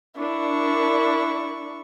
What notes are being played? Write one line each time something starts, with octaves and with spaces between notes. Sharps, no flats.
D4 E4 A#4 C#6